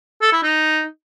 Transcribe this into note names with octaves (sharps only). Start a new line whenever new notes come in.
A4
E4
D#4